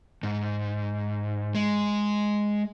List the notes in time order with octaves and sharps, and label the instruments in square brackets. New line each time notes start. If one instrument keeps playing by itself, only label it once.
[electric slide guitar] G#2
G#3